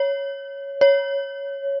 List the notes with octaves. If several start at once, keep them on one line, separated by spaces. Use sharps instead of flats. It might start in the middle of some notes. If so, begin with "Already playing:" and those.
Already playing: C#5
C#5